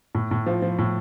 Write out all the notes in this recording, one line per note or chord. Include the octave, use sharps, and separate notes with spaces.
A2
A2
F3
F3
A2